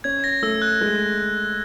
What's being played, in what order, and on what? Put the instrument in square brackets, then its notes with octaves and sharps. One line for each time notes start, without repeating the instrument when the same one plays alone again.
[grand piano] C#4 [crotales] G#6
[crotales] A#6
[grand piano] A3 [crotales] E6
[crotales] F#6
[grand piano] G#3